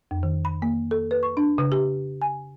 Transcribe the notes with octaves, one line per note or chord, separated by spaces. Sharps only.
F2
D#3
B5
A#3
A4
B4
C#6
D4
C#3
G4
G#5